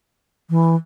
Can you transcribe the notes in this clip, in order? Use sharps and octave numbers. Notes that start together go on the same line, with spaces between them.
E3